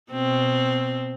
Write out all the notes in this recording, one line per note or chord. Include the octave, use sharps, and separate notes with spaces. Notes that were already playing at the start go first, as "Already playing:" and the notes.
B2 C4